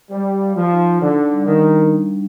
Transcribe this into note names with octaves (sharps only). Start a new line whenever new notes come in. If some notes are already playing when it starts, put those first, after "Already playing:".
G3 C5
F5
F3
D#4
D3 D4
G3
D#3
D4